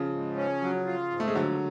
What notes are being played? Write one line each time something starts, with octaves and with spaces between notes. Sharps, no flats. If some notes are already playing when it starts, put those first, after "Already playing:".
Already playing: C#3 F3
G#2
C#4
F#3
F4
G#2
A3
G#3
F2 D3 F#3